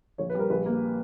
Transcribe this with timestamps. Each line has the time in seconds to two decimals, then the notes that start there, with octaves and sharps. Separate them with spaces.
0.18 A#1 C#5
0.30 B4
0.35 G3 A#4
0.50 A#1 B4
0.66 A#3